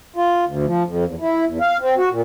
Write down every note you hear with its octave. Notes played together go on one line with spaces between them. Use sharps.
F4
D2
F3
F2
E2
E4
E2
F5
C4
F#4
A#2